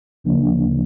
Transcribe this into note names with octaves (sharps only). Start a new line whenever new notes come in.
D2 C#3 F3 A#3 D4